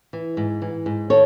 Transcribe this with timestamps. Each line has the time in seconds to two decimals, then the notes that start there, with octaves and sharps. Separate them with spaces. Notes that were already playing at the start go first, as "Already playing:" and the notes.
0.13 E3
0.37 G#2
0.62 E3
0.86 G#2
1.10 D#3 A4 C#5